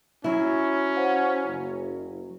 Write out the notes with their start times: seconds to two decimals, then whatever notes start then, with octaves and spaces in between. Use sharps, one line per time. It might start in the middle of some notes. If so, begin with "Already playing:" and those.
0.24 F#3 C#4 E4
0.96 C5 F5 F#5
1.45 F#1